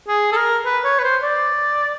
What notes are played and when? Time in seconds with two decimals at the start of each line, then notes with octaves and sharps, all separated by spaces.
0.08 G#4
0.32 A4
0.37 A#4
0.66 B4
0.85 C#5
0.99 B4
1.04 C5
1.23 D5